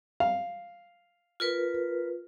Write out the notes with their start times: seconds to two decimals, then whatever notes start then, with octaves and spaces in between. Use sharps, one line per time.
0.20 F5
1.40 F4 A#4 B4